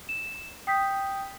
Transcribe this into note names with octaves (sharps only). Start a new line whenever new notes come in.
E7
G5 D#6 G6 B6